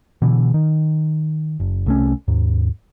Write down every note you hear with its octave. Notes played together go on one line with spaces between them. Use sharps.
B2 D3 E3
D#3
F#1
C2 A3 C#4
D#2 G#2